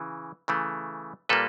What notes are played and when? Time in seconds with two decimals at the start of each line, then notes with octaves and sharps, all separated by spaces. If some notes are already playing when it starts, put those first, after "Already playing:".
Already playing: C#3 E3
0.48 C#3 E3 A3
1.29 A#2 G3 A#3 A4 B4